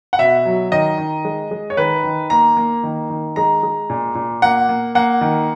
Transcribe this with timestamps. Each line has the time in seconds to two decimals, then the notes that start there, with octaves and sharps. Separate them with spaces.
0.13 F#5
0.18 B2 E5
0.45 F#3
0.72 D#3 D#5
0.98 D#3
1.25 G#3
1.51 G#3
1.70 C#5
1.77 D#3 B4
2.04 D#3
2.30 A#3 A#5
2.57 A#3
2.83 D#3
3.10 D#3
3.36 G#3 A#5
3.63 G#3
3.90 A#2
4.15 A#2
4.42 A#3 F#5
4.69 A#3
4.95 A#3 F#5
5.21 D#3